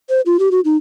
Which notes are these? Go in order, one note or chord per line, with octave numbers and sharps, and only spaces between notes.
C5
F4
G4
F#4
D#4